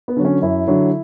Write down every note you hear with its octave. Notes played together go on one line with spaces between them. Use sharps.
B3
D3 F#3
C#4
F#2 E4
D3 F#3